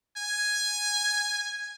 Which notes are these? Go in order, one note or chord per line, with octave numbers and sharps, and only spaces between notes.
G#5